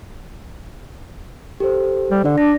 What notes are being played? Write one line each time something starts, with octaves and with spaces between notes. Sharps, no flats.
G4 A4 C5
G3
D3 D4 D5
D4 A#6